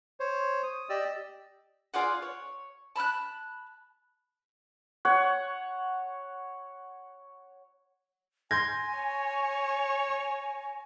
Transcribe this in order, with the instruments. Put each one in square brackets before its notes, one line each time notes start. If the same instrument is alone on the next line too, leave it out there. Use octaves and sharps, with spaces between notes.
[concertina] C5 C#5
D#6
G4 D5 D#5 E6
[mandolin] F4 G#4 D5 F#5
C#5
A5 B5 F6 F#6
[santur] C#5 F#5
[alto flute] G#5 [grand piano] C6 G6 G#6 [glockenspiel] A#6
[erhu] C#5